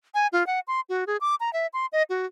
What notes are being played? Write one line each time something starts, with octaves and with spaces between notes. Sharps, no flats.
G#5
F4
F#5
C6
F#4
G#4
D6
A#5
E5
C6
D#5
F#4